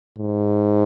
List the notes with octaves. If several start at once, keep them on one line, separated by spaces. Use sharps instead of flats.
G#2